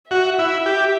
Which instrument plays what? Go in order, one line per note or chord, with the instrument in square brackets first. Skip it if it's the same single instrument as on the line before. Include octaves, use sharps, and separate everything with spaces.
[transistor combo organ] F#4 [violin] E5
[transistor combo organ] E4
G4